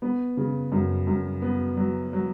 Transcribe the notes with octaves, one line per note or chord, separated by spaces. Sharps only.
B3
C#3
F#2
F#2
B3
F#3
F#3